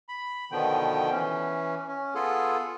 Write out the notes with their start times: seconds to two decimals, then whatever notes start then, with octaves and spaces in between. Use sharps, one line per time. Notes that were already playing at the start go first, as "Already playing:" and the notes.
0.09 B5
0.52 B2 D3 D#3 F3 B3 G5
1.12 E3 C#4
1.88 C#4
2.15 B3 F4 G#4 A4